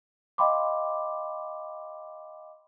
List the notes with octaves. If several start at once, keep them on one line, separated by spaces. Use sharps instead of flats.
D#5 F5 G5 B5 C6 D6